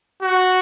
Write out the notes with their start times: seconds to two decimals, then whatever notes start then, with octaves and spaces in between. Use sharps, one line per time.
0.22 F#4